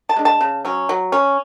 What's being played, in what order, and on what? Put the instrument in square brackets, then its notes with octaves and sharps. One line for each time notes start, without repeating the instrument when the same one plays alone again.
[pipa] A5
G#3 D4
A5
C#3
F#3 C#4
F#3
C#4